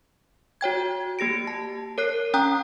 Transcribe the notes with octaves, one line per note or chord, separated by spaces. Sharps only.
F#4 C#5 G5 G#6
A#3 G4 A#6 D7
A5
A#4 C#5 F#6 C7
C#4 G5 A#5 D#6 F#6